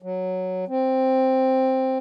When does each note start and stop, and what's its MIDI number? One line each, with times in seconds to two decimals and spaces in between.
0.02 0.65 54
0.68 1.98 60